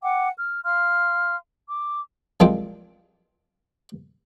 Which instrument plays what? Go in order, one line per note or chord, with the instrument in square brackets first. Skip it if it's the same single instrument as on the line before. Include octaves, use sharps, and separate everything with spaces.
[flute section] F#5 G5 D6
F6
F5 C6 F6
D6
[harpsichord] C2 A#2 F3 G#3 C4 D6